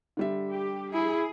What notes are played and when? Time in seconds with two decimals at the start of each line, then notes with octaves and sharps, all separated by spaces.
0.17 D3 G3 E5
0.53 G4
0.94 E4 G#4